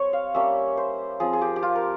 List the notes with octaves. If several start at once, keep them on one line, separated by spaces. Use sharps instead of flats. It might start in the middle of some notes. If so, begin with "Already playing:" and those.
Already playing: G3 C4 C#5
F5
G3 A#3 C#4 E5
C5
F3 C4 F4 G#4
G#4
G4
G4
F4
A#4